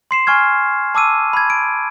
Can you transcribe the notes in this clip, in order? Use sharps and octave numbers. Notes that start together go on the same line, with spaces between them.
C6 C7 E7
G#5 C#6 F6 G#6
A5 D6 E6 D#7
B5 G#6
D7